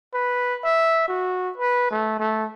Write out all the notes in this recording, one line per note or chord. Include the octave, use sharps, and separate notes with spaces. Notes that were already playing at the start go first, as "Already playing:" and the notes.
B4
E5
F#4
B4
A3
A3